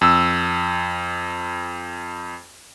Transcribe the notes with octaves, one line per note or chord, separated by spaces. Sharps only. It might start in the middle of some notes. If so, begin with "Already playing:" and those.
F2 E6